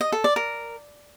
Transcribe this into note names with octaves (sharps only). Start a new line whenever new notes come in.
D#5
A4
D5
A#4